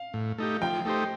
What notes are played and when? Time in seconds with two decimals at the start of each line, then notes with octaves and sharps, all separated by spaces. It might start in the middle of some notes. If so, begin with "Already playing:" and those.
Already playing: F5
0.14 A2
0.38 A3 D#4 G4
0.61 F3 G5
0.85 A3 D#4 G4 C5